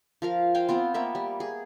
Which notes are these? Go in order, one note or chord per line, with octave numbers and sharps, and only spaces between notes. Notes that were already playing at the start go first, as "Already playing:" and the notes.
F3 A#4 F5
C5 F5 G5 G#5
B3 C4 F4
A#3 B3 E5
G3
G#4